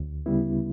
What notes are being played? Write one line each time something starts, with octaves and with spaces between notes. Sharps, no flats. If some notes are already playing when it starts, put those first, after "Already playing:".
Already playing: D2
C#3 G3 B3 E4